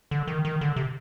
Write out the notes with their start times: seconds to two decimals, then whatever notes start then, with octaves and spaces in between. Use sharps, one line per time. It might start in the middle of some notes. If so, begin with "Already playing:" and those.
0.11 D3
0.28 D#3
0.45 D#3
0.61 D3
0.76 C3